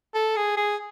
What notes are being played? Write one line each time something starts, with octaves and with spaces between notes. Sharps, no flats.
A4
G#4
G#4